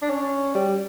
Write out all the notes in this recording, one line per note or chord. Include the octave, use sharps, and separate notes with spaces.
D4
C#4
G3